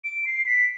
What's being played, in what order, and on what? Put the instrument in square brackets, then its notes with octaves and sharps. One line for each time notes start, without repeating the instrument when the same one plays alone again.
[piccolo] D7
C7
B6